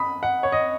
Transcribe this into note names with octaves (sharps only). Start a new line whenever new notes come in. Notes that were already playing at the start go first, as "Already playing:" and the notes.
Already playing: B5 D#6
F#5
C#5
D#5